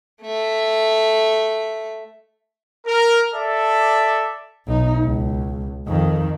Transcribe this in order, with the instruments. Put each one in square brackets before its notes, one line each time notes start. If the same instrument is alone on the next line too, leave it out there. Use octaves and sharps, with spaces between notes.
[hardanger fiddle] A3 E5
[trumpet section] A#4
A4 D5 E5
[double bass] B1 D#4
C#2
F2 D#3